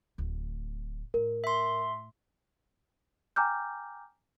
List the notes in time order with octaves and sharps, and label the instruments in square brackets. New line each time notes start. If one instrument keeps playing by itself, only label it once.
[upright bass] D1 D2
[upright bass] A2 [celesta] A#4
[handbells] E5 C6
[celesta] G5 G#5 A#5 D6 F6 G6